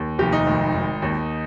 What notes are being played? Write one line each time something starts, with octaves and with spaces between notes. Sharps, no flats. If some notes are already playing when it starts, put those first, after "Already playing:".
Already playing: D#2
F1 G4
D#4
G#1
G#1
D#2